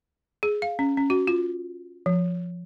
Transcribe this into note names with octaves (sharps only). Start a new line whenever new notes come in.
G#4
F5
C#4
C#4
F#4
F4
F3